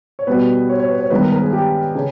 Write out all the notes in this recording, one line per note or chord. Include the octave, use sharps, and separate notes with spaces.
C#5
B2 G3 B3 B4
C#5
C#5
B4
C#5
G2 D#3 G#3 B3 B4
A#4
A#4
G#4
G4
C#3 G#4